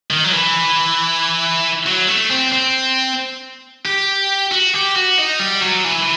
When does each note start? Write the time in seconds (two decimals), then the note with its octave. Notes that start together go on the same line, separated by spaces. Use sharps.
0.10 D#3
0.24 F#3
0.32 E3
1.86 F#3
2.08 A3
2.31 C4
2.53 C4
3.85 G4
4.51 F#4
4.74 G4
4.96 F#4
5.18 D#4
5.39 G3
5.61 F#3
5.84 E3